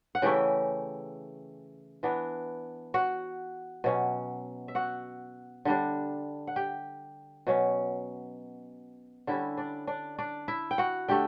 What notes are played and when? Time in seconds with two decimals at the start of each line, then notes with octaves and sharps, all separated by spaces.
0.15 F#5
0.22 C#3 E3 A3 C#4 G4 G5
2.03 E3 B3 D4
2.94 F#4 F#5
3.84 B2 F#3 C#4
4.68 E5
4.75 F#4 F#5
5.65 D3 G3 D4
6.47 F#5
6.56 G4 G5
7.47 B2 F#3 C#4
9.27 D3 G3 C#4 E4 E5
9.57 D4 D5
9.87 D4 D5
10.18 D4 D5
10.48 E4 E5
10.71 G5
10.78 F#4 F#5
11.08 D3 A3 G4 G5